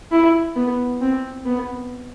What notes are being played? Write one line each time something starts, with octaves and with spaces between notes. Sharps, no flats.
E4
B3
C4
B3